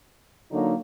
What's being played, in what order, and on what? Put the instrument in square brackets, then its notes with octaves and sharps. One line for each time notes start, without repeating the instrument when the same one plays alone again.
[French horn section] D3 F#3 A#3 D#4